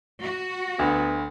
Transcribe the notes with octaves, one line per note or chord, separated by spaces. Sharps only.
F#4
D2 B3